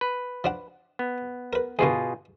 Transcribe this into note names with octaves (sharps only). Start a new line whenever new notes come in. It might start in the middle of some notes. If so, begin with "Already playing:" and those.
B4
F3 D4 F#5
B3
A#4 B4
E2 G2 B2 D3 F4 G#4